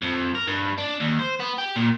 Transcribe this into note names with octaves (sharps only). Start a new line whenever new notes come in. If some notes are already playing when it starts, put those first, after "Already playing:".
F2
A#4
G2
D4
D#2
C5
B3
G4
A#2